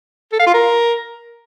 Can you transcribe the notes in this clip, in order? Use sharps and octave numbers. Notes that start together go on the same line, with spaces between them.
A4
F5
F4
A#4